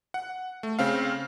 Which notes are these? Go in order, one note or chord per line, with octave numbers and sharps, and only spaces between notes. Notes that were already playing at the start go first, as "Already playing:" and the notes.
F#5
A3
C#3 C4 F5